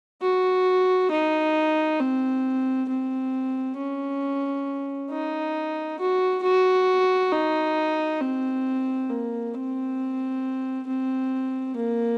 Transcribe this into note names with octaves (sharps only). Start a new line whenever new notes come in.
F#4
D#4
C4
C4
C#4
D#4
F#4
F#4
D#4
C4
A#3
C4
C4
A#3